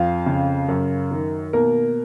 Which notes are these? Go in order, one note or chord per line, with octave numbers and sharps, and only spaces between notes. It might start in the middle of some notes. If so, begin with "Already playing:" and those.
Already playing: F2 F4 F5
C#3
F#2
D#3
B2 A#3 A#4